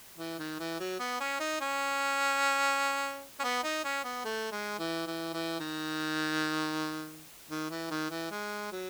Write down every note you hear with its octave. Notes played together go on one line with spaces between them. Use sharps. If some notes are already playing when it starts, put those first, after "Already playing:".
E3
D#3
E3
F#3
B3
C#4
D#4
C#4
C#4
B3
D#4
C#4
B3
A3
G#3
E3
E3
E3
D#3
D#3
E3
D#3
E3
G#3
F#3